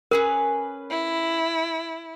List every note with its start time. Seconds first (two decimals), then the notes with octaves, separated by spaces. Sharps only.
0.11 C#4 G#4 A#4 B4
0.90 E4